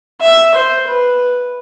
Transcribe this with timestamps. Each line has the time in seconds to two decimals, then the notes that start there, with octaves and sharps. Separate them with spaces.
0.21 E5
0.55 C5
0.88 B4